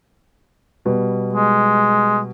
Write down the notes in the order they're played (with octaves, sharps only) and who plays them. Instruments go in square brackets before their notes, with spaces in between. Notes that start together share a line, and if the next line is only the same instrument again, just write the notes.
[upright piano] B2 G3
[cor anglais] G#3